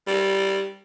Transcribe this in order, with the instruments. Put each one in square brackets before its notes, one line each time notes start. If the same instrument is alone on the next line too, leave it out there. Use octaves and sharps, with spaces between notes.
[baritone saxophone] G3